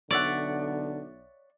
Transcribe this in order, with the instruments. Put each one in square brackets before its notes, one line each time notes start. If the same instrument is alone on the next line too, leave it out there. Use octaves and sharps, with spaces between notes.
[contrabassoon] B1 [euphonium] D3 [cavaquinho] C#5 E5 F#5 [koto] D5